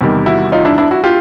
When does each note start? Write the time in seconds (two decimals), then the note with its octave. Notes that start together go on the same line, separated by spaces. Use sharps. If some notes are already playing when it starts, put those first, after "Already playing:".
0.01 E2 C3 D#3 G3
0.26 E4 F#4
0.52 D#4 F4
0.65 D4 E4
0.78 D4 E4
0.91 E4 F#4
1.04 F4 G4